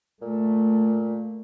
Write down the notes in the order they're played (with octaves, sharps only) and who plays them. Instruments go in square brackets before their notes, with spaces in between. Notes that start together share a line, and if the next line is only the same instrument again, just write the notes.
[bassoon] A#2 [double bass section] A3